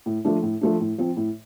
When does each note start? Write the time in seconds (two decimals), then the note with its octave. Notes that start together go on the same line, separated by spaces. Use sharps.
0.06 A2
0.25 F3 A3 D4
0.43 A2
0.61 F3 A3 D4
0.80 A2
0.98 F3 C4
1.17 A2